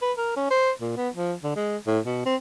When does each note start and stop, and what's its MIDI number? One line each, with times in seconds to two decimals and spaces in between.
0.02 0.12 71
0.18 0.32 70
0.36 0.47 61
0.51 0.71 72
0.81 0.93 46
0.97 1.09 59
1.15 1.34 53
1.43 1.52 50
1.56 1.77 56
1.87 2.00 45
2.06 2.24 47
2.26 2.36 60